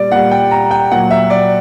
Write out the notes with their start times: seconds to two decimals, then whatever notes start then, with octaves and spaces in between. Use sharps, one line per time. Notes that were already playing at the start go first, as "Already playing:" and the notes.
Already playing: A#2 G3 D5
0.12 A#2 G3 F#5
0.31 G5
0.51 A#5
0.71 G5
0.91 A#2 F#3 F#5
1.11 E5
1.30 D5